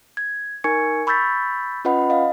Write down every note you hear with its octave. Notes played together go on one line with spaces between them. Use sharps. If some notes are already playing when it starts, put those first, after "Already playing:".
G#6
D#4 A#4 G#5 C#6 G#6 C#7
B5 C#6 E6 G6 A6 B6
C#4 F4 B4 D#5 F#5 B5
D#5 F5